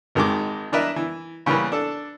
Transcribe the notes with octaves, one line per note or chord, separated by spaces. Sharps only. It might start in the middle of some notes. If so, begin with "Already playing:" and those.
G#1 D#3 G#3 D6
E3 D4 A#4 B4 D#5 E5
E3
C#3 E3 G3 A#3 B3 B4
D4 A4